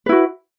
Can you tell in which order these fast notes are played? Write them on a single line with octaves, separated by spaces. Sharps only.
B4 E4 F#4